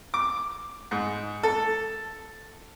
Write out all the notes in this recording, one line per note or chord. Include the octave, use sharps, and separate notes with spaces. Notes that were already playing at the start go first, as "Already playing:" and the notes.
D6
G#2
A4